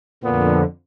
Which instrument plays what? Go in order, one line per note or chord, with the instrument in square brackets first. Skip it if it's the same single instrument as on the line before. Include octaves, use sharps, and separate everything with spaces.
[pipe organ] F2 D3 [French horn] A#2 [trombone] B3